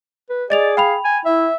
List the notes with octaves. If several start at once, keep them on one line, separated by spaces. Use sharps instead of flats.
B4
G#4 D5 D#5 A6 F7
F5 G5 B5 F7
G#5
E4 E5